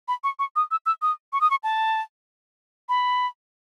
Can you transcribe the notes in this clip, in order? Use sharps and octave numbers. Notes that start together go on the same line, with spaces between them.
B5
C#6
C#6
D#6
E6
E6
D#6
C#6
D#6
C#6
A5
B5